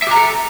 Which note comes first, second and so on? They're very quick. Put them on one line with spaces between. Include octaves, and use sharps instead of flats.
E5 G4 A#5 A4